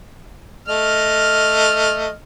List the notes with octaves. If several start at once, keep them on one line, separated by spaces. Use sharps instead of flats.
A3 D#5 F6